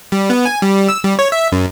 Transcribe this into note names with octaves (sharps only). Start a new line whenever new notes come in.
G3
B3
G#5
G3
E6
G3
C#5
E5
F#2